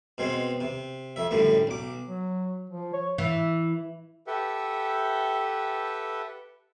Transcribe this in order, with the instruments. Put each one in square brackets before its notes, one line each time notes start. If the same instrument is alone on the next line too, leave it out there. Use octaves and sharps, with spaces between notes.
[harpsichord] B2 G#3 C4
C3
F2 E5
F#2 A2 D3 G3
B1 D6
[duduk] F#3
F3
C#5
[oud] E3
[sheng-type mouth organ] G4 A4 B4 E5 F#5 G5